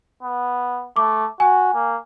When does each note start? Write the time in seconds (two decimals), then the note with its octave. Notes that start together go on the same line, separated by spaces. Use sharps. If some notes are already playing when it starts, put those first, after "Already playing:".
0.23 B3
0.96 A3 D6
1.40 F#4 G#5
1.74 A#3